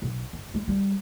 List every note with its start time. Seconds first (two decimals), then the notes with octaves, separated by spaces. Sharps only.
0.02 B1
0.33 G1
0.54 G#3
0.68 G3